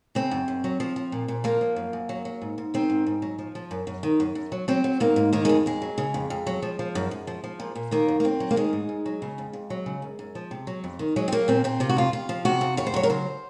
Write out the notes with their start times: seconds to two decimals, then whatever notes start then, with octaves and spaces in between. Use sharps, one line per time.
0.15 C#3 C4
0.31 F#2
0.48 F#2
0.64 F#3
0.80 F3
0.96 F3
1.12 A#2
1.28 A#2
1.44 F3 A#3
1.61 F3
1.76 F#2
1.93 F#2
2.09 F#3
2.25 F#3
2.42 G#2
2.58 G#2
2.74 D#3 C4
2.90 G#2
3.06 G#2
3.22 F#3
3.39 F3
3.55 F3
3.71 F#2
3.87 F#2
4.03 D#3
4.20 F#2
4.35 F#2
4.52 F#3
4.68 F#3 C4
4.84 F#3
5.00 G#2 A#3
5.16 G#2
5.33 D#3 A#3
5.45 F2 G#3
5.66 F2 G#3
5.82 F#3
5.98 C#3
6.14 F2
6.30 F2
6.47 F#3
6.62 F3
6.79 F3
6.95 F#2
7.11 F#2
7.27 F3
7.44 F3
7.60 A#2
7.75 A#2
7.91 D#3 A#3
8.08 F#2
8.20 A#3
8.24 F#2 C4
8.40 F#3
8.51 A#3
8.56 D#3 G#3
8.73 G#2
8.89 G#2
9.06 F#3
9.22 C#3
9.38 F2
9.53 F2
9.70 F#3
9.86 C#3
10.02 F#2
10.19 F#2
10.35 F3
10.51 C3
10.67 F#3
10.84 F2
10.99 D#3
11.16 F#3 G#3
11.28 C4
11.32 F#3 A#3
11.48 A#2 C4
11.64 A#2 C4
11.80 C3 F4
11.89 F#4
11.97 F2 F4
12.13 F2 F4
12.29 F3
12.45 C3 F#4
12.61 F2
12.77 F2 C#5
12.87 C5
12.94 F#3 C#5
13.03 A#4
13.10 C#3 C5